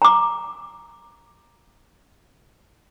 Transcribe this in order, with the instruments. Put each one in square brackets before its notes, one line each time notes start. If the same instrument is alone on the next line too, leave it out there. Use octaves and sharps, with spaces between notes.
[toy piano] A#5 D6